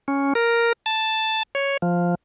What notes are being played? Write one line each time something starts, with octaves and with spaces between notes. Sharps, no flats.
C#4
A#4
A5
C#5
F3